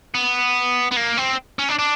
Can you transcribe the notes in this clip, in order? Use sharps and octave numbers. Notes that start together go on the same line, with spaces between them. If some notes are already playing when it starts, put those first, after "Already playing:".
B3
B3
A#3
C4
C#4
D4
D4